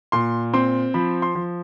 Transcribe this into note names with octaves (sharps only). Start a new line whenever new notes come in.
A#2 C6
C4 C6
F3 B5
C6
F3